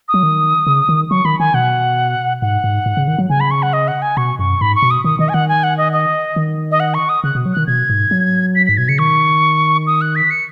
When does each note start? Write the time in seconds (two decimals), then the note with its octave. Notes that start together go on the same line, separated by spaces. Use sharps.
0.08 D#6
0.14 F#3
0.23 D#3
0.67 C#3
0.89 D#3
1.10 F#3 C#6
1.25 D#3 B5
1.39 D#3 G#5
1.54 B2 F#5
2.42 G#2 F#5
2.64 G#2
2.86 G#2
2.97 C#3
3.08 D#3
3.18 F#3
3.29 C#3 G#5
3.40 B5
3.51 C#6
3.62 F#5
3.73 D#5
3.88 F#5
4.02 G#5
4.17 B2 C#6
4.39 F#2 C#6
4.61 G#2 B5
4.75 C#6
4.82 B2
4.91 D#6
5.04 D#3 D#6
5.19 D#3 D#5
5.29 G#5
5.34 D#3 F#5
5.49 G#5
5.63 F#5
5.77 D#5
5.92 D#5
6.36 D#3
6.71 D#5
6.80 F#5
6.94 C#6
7.09 D#6
7.24 C#3 F#6
7.35 B2
7.46 F#3
7.53 D#3 F#6
7.67 B2 G#6
7.90 G#2
8.11 F#3
8.55 B6
8.66 G#2 B6
8.77 B2 G#6
8.88 C#3 C#7
8.98 D#3 C#6
9.87 D#6
10.01 F#6
10.16 B6
10.30 C#7